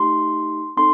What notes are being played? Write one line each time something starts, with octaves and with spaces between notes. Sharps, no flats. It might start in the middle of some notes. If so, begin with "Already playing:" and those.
Already playing: A3 D#4 G4 C6
C4 D#4 A4 C6